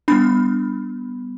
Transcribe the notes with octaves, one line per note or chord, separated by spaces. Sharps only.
G3 B3 D4 B5